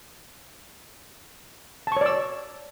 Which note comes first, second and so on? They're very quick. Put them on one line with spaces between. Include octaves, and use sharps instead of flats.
A5 C#6 C#5 D5 E6